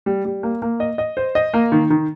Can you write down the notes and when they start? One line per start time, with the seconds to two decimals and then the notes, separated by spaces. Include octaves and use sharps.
0.06 G3
0.25 G3
0.43 A#3
0.62 A#3
0.80 D#5
0.98 D#5
1.17 C5
1.35 D#5
1.54 A#3
1.72 D#3
1.90 D#3